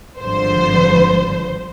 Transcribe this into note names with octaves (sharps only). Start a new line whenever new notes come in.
G#1 G2 D3 F3 C5